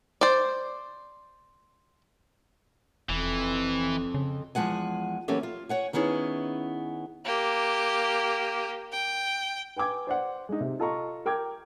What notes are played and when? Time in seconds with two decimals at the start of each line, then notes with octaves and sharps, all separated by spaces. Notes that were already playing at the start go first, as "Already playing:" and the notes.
0.21 C5 D5
3.09 E1 F2 E3
4.14 C#3
4.55 E2 F3 G#3 F#5 G#5
5.28 E3 F#3 A#3 C#4 G4 A4
5.43 F4
5.69 C#5 F#5 G#5
5.93 D#3 B3 C#4 E4 G#4
7.25 A#3 G4
8.92 G5
9.76 B4 G5 G#5 D6 G#6
10.07 C5 D5 F#5
10.49 G#3 D#4
10.61 C3
10.80 F4 A4 D#5 A#5 C#6
11.26 A#4 G5 D6 G#6